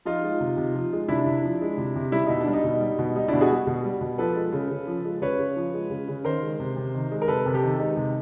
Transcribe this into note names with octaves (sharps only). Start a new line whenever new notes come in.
F3 D#4 F4
G#3
C3
C3
F3
G#3
C3 D4 E4
C3
F3
G#3
C3
C3
G3 E4
B2 D#4
D4
G3
D#4
B2
G3
B2
G3 D#4
B2 D4 E4
F#4 G#4
G3
B2
G3
B2
F3 A4 B4
G#3
C#3
C#3
F3
G#3
C#3 B4 C#5
C#3
F3
G#3
C#3
C#3
D#3 A#4 C5
G#3
C3
C3
D#3
G#3
A#4
C3 A4 B4
C3
G4 A4
D#3
G#3 D#4
C3